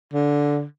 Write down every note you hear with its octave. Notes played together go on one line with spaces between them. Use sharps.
D3